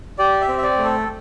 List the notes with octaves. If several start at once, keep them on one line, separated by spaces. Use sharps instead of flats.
G4 D5
E5
C4
E5
D5
A3
A4